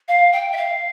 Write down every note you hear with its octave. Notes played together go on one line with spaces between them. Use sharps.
F5
G5
E5
F5